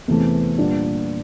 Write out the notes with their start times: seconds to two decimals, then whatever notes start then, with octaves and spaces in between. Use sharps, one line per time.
0.08 E2 C3 E3 A3 C4
0.58 A#2 G3 B3 D4 F4